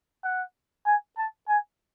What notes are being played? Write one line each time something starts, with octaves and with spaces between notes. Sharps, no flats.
F#5
G#5
A5
G#5